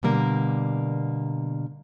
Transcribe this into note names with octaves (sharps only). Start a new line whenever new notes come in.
B2 D3 G3 A#3 A#4